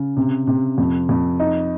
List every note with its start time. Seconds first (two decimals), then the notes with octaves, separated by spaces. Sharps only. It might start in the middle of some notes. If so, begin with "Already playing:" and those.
Already playing: C#3
0.17 C3
0.47 C3
0.78 F2
1.09 F2
1.40 D#4